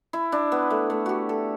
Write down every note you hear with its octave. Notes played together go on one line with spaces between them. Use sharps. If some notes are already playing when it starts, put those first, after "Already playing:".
E4
D4
B3
A3
A3
F#4 G4
A4